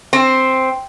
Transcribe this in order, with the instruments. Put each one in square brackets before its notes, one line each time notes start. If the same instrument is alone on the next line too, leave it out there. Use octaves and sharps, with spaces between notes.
[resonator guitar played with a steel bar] C4